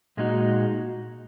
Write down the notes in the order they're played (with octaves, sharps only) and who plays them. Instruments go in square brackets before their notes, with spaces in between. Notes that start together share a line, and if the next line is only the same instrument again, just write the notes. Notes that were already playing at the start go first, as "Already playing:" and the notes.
[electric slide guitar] A#2 G#3 D#4 F#4